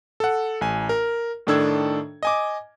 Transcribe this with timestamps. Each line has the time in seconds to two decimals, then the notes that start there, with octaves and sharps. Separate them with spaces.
0.20 A4 F#5
0.61 A1 G#5
0.89 A#4
1.47 A2 D#3 D4 A4 E6 G#6
2.23 D#5 G#5 D6